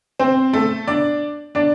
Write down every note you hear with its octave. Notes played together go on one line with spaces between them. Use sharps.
C4 C5
A3 A4
D4 D5
D4 D5